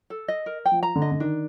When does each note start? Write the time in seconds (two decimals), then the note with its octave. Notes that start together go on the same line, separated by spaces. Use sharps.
0.10 A4
0.28 D#5
0.46 A#4
0.66 G5
0.72 F3
0.83 A#5
0.96 D3
1.02 D#5
1.12 D3
1.20 D#3 D4